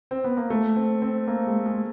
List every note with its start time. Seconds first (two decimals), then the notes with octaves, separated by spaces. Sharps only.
0.11 C4
0.24 B3
0.37 A#3
0.50 A3
0.76 C4
1.02 C4
1.27 A#3
1.47 G#3
1.66 G#3